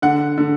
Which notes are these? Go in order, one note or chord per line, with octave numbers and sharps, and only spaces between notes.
D3 F#5
D3